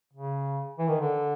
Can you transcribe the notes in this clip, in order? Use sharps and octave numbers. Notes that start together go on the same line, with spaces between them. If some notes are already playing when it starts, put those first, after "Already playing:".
C#3
E3
D#3
D3